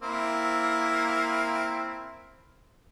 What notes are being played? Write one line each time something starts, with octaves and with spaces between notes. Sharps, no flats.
A#3 C4 E4